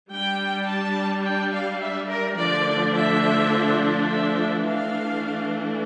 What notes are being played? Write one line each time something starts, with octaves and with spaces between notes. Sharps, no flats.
G3 D4 G5
A5
G5
F5
E5
A#4
D3 F3 A3 D4 D5
E5
E5
E3 A3 D4 F5